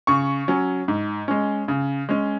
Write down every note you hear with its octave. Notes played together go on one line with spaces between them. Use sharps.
C#3 C#6
F#3 C#4
G#2
G#3 C#4
C#3
G#3 C#4